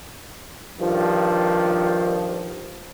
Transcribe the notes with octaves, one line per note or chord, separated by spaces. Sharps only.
G2 D#3 F3